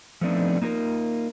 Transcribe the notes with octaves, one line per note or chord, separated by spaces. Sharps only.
F3 A3 B3 C4 D4 D#4
A#3 D#4 F4 A#4